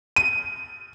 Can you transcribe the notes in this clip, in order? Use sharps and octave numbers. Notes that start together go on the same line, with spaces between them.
D#7